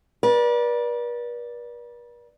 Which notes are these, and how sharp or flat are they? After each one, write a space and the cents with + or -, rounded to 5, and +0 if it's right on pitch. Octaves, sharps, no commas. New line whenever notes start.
B4 -45 D5 +0